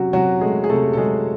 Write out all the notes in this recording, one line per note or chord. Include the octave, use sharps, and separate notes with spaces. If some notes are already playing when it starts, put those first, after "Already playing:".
Already playing: C3 F#3 C#4 F#4
C3 F#3 F#4
G#3 A3 G#4
G#4
C3 A3 A4
A4
F#3 G#3 G#4